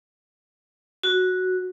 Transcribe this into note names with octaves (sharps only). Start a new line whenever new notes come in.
F#4